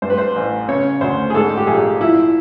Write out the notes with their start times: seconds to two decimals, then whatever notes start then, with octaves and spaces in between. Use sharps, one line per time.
0.02 G2 C5
0.10 B4
0.18 C5
0.36 A1
0.68 C#3 C#5
1.01 D2 C5
1.30 G#4
1.34 G#2 A4
1.57 G4
1.67 A#1 G#4
2.01 F3 E4